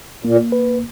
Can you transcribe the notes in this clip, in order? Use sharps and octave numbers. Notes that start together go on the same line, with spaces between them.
A#2 A#3
B4